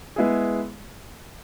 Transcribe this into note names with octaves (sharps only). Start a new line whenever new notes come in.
G#3 B3 E4 G#4